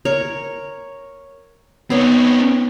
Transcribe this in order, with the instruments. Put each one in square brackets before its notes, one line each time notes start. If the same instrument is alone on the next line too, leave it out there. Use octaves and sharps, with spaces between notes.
[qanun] A#4 C#5
[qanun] B3 C#5 [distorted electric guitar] C4 D#4